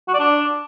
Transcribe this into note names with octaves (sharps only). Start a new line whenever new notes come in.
F#4
D5
D4